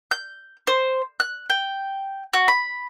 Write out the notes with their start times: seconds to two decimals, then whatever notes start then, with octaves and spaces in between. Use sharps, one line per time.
0.11 G6
0.67 C5
1.20 F#6
1.50 G5
2.33 F#4
2.48 B5